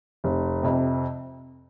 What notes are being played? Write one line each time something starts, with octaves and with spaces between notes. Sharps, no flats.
F1
F2 C3